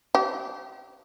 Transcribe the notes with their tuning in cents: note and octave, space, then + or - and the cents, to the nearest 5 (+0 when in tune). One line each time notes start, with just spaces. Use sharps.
G4 -30